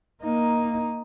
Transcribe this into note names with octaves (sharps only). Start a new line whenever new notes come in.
A#3 D#4